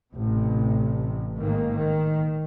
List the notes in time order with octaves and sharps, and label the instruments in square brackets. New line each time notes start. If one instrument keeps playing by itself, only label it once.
[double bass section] A1 C3
G#2 D#3 A#3
D#3